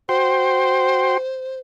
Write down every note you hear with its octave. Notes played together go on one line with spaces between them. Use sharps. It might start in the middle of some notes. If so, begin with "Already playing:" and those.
F#4 C5 G5 C6